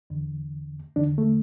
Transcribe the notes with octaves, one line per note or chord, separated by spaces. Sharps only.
E2 D3
E2 D3 D4
A3